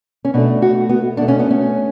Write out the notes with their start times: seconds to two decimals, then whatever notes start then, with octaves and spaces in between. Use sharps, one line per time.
0.25 C#4
0.34 B2 A3 D4
0.62 F#4
0.89 B3
1.17 B2 A3 D4
1.28 C#4
1.39 B3
1.51 C#4